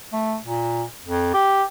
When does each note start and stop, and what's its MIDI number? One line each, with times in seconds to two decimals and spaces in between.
0.13 0.35 57
0.44 0.83 46
1.05 1.30 41
1.33 1.63 67